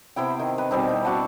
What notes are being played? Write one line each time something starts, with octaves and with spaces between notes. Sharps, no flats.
C3 B3 E4 G5
D#3
B4
B2 G3 C4 D#4
E4
D4 F#4 F#5 A5